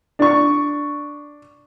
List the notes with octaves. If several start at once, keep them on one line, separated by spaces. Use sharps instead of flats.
D4 C#6